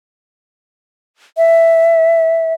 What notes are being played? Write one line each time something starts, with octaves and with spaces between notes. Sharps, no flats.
E5